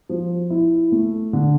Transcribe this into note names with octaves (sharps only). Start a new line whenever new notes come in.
F3
E4
A3
D3